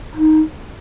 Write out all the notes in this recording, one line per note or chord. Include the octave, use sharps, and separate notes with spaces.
D#4